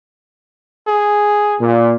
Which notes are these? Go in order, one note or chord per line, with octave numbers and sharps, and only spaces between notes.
G#4
A#2